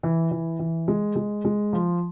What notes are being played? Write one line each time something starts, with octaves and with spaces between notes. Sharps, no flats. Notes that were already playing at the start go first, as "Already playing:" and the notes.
E3
E3
E3
G#3
G#3
G#3
F3